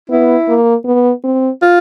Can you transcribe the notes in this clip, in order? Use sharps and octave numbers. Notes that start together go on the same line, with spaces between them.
B3 E4
A#3
B3
C4
F4